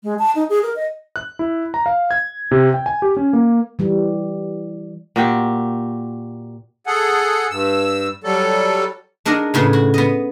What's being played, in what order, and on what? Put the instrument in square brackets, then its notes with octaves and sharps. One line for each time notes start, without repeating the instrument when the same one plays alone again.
[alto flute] G#3
A5
D#4
G#4
A#4
D#5
[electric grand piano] F#6
E4
A#5
F5
G#6
C3
G5
G#5
G4
C#4
A#3
[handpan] E3 G3
[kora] A#2 F#4 G4
[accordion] G#4 A4 F#5
G2 E6
F#3 G3 A4
[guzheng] G#3 D4 D#4 A#4 D#5 F#5
A2 C#3 B3 G#4
F#4
B3 D#5